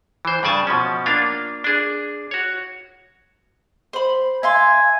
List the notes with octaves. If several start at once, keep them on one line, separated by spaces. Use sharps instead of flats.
E3 C5
G2 C#3 D5 G#5 A5
B2 F3 C#4
A#3 D4 F4 F5
D4 G#4
F#4 C#5
C5 B5
E5 F5 G#5 C6